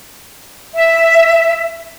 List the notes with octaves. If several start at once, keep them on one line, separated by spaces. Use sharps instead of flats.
E5